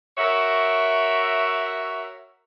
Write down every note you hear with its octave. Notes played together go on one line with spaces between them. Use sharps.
F#4 A#4 C#5 E5